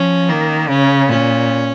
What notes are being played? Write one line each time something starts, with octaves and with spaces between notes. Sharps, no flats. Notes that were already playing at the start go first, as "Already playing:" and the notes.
Already playing: F3 C#4
D#3 A#3
C#3 C#4
A#2 C#4